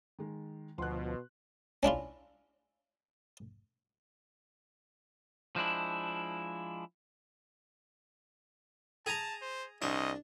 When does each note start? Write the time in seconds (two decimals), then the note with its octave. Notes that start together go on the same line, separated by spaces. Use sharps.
0.19 D#3 G#3
0.78 D2 B2 F3 C6 F#6
1.83 C#4 D4 E4 F4
5.56 F3 G#3 D4 E4
9.06 G#4 A5 A#5
9.42 C5
9.82 C2 D4 D#5